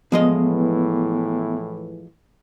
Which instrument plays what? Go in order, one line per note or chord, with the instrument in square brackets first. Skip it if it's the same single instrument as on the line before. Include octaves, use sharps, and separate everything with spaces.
[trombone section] A2 E3 [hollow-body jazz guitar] F3 G#3 D#5 [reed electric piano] B3